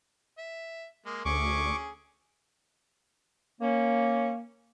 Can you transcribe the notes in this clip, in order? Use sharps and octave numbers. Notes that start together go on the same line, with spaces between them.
E5
G#3 A#3
D2 C#4 G#4 C#6 D6
A#3 C#4